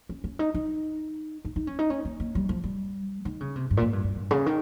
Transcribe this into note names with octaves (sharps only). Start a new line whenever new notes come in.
C#4
C#4
D#4
D#4
D#4
D#4
C#4
D#4
C#4
A#3
A#3
G3
F3
G3
D#3
C#3
C3
G2
A#2
G#2
G2
G2
G2
C#3
D#3